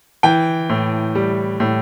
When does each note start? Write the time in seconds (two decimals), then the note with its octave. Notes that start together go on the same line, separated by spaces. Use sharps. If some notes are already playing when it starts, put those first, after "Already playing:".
0.23 E3 G5
0.69 A2
1.15 G3
1.60 A2